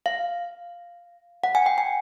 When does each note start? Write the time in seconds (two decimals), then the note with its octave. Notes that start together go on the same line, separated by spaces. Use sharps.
0.06 F5
1.44 F#5
1.55 G#5
1.66 G5
1.78 G#5